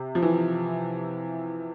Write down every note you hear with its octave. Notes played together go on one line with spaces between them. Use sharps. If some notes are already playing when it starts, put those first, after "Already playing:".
Already playing: C3
F3
E3